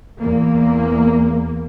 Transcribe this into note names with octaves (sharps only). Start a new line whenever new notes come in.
E2 A#3